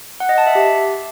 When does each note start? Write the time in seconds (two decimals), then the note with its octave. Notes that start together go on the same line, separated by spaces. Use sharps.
0.20 F#5
0.29 D#5
0.38 A5
0.47 E5
0.55 G4